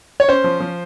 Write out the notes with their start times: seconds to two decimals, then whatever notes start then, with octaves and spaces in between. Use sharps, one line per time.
0.20 C#5
0.29 C#4 C5
0.44 F3
0.60 F3